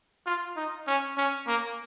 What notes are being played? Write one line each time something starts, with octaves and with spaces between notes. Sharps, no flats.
F4
D#4
C#4
C#4
A#3